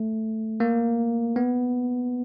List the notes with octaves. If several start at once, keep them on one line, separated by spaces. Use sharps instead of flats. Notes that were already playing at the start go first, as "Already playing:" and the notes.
Already playing: A3
A#3
B3